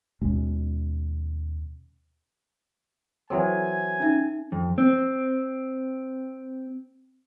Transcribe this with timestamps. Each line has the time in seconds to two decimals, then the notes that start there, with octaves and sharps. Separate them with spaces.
0.22 D#2 B2 G#3 C#4
3.30 E3 F#3 C4 A4 C5 G#5
4.00 C#4 D#4 E5
4.52 F2
4.78 C4